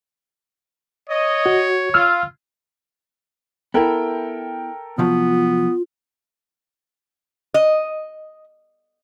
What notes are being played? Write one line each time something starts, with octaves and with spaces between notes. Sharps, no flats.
C#5 D#5
F#4
F4 E6 F6
B3 E4 A4 A#4 G5
C3 F3 F#3 B3 F4
D#5